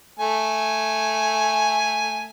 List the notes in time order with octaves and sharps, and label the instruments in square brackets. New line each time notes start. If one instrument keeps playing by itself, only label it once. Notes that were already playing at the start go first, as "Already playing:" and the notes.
[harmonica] A3 G#5